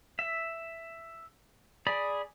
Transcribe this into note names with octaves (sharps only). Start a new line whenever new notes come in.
E5
G#4 D5 B5